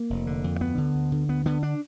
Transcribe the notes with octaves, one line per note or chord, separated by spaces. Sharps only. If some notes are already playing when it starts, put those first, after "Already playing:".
Already playing: A#3
F1
D3
F2
D2 B3
D3
D2
D3
D2 B3
D3 B3
D4